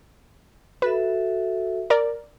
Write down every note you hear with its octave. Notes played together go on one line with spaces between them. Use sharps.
F#4 A4 B4 E5
A#4 D5